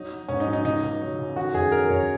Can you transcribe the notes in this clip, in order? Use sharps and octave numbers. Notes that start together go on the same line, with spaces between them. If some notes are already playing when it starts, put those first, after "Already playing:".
Already playing: F#3 D#4
F#3
G#2 C#4
D#4
F#3
D#4
C#2 D#4
C#2
F#3
C#3
D#3 F#4
F#2 G#4
F#3 A#4
F#2 C#5